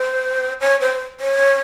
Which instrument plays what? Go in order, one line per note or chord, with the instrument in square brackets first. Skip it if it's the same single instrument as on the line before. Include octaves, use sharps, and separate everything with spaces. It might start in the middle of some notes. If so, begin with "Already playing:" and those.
Already playing: [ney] C5
C#5
C5
C#5